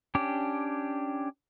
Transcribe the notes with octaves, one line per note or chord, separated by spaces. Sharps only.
C#4 D4 G4